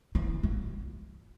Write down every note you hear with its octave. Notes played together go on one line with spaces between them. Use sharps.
E3
G3